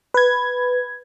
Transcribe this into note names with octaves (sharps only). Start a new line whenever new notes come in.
B4 G#6